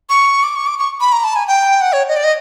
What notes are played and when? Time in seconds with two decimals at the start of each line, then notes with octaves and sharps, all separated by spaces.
0.10 C#6
0.43 D6
0.55 C#6
0.67 D6
0.78 C#6
1.01 B5
1.12 A#5
1.24 A5
1.36 G#5
1.47 G5
1.81 F#5
1.93 C#5
2.08 D#5
2.16 D5
2.24 D#5